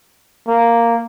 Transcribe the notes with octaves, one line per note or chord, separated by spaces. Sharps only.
A#3